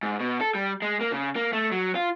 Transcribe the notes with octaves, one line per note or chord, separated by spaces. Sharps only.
G#2
B2
A4
G3
G#3
A#3
C#3
A#3
A3
F#3
F4